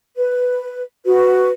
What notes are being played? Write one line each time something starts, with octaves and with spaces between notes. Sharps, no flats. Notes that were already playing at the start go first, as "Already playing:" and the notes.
B4
F#4 B4